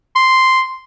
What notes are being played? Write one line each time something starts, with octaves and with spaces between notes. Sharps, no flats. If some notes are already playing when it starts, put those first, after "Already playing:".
C6